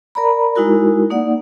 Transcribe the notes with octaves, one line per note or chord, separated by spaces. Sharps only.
A#4 D5 A#5 B5
G#3 D#4 E4 F#4 A#4
A#3 D#4 D5 F#5